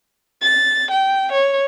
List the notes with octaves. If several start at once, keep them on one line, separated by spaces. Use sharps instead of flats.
A6
G5
C#5